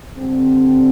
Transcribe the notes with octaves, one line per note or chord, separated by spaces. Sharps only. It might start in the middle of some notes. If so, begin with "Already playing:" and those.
D3 G3 C4